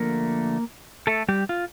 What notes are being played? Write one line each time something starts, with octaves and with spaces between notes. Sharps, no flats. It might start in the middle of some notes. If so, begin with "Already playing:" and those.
Already playing: D3 F3 A3 A#3 A#4
A3 A4
G3 G4
F4